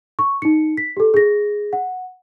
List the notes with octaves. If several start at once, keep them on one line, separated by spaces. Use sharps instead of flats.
C#6
D#4 C#7
B6
G4 A4
G#4 A#6
F#5